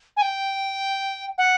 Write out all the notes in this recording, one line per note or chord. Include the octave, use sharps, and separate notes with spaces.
G#5
G5
F#5